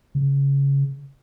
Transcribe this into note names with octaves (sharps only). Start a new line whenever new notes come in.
C#3